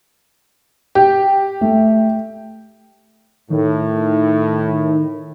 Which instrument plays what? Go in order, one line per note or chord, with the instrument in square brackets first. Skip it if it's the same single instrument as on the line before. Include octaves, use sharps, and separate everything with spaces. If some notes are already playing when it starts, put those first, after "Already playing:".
[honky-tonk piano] G4
[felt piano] A3
[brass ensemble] A2 [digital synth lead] D#3